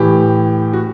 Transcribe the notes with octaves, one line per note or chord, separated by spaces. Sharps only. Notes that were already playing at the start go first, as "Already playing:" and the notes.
Already playing: A2 E3 G4
F#4